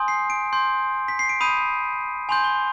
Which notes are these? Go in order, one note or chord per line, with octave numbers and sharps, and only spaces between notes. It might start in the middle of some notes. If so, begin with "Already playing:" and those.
Already playing: G#5 C6 D#6 G6
C7
D7
C6 G6
B6
C7
D7
B5 D#6 G6 D#7
G#5 C6 G6 F7
G7